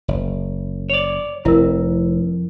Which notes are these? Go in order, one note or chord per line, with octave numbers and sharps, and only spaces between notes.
F#1
C#5 D5
F1 F2 E4 A#4